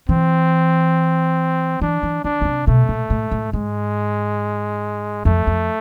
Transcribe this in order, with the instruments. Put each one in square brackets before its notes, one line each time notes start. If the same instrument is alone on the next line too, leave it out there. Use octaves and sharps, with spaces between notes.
[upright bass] E3 [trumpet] C4
[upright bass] E3 [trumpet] D4
[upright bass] E3
[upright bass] D3 [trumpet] D4
[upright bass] C#3
C3
[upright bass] B2 [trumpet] A3
[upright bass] A#2
A2
A2
[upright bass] G#2 [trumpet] G#3
[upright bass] F2 [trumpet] A3
[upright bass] F2